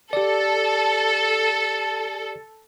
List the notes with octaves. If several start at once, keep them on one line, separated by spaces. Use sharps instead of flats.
G4 A4 D5